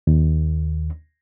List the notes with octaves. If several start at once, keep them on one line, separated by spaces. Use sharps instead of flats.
D#2